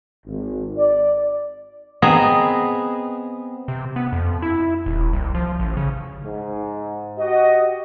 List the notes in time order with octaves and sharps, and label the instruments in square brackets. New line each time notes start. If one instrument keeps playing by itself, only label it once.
[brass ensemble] G#1
D5
[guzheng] B3 C4 G#4 D#5 A#5
[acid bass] C3
B3
F2
E4
D#1
C2
F3
A1
C#3
[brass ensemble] G#2
F#4 G4 D#5